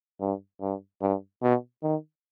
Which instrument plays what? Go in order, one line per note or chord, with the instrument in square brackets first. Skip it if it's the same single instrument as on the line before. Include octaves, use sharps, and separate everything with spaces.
[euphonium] G2
G2
G2
B2
D#3